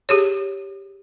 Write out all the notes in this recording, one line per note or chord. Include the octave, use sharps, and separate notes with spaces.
G4 G#4 C#5